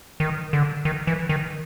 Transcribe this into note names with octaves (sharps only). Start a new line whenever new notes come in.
D#3
D3
D#3
E3
D#3